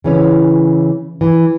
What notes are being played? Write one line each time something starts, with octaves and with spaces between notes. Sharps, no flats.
C#3 E3 C#4
E3